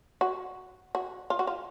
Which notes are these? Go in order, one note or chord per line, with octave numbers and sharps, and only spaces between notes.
F#4
F#4
F4
F#4
F4